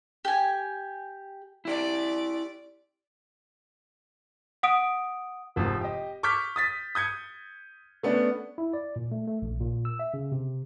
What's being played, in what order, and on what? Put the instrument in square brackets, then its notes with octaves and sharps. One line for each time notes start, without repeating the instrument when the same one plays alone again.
[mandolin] G4 G#5
[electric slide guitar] E4 G4 [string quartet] D5
[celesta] F#5 D#6 D7
[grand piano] F1 G#2 F3
G4 D#5
C#6 D6 E6 F6 G6 B6
D#6 A6 B6
D#6 G6 G#6 C#7
A3 B3 C#4 D4
[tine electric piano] E4
D5
A#2
A3
A3
A#1
A#2
E6
E5
C#3
C3